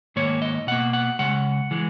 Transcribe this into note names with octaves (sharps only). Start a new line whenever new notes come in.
G#2 D#3 A#3 C#5
D#5
B2 A#3 F#5
F#5
C#3 G#3 F#5
E3 G#3